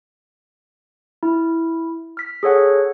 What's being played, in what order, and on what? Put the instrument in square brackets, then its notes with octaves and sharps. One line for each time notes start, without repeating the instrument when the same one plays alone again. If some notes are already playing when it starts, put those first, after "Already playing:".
[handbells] E4
F6 B6
G#4 A4 C#5 F#5